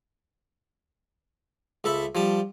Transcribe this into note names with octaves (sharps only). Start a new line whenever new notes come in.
C#2 A4 E5 B5
F3 G3 A5